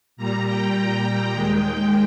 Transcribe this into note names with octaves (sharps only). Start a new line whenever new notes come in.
A#2 G3 A#5
G5
D#2 D#3 G#3